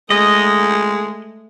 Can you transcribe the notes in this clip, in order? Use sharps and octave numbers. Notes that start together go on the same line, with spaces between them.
G#3 A3 D#5 D#6